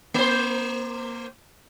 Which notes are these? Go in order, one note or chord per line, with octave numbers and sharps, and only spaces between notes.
A#3 C5